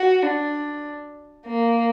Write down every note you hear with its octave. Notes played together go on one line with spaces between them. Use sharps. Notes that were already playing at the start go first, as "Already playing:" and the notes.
Already playing: F#4
D4
A#3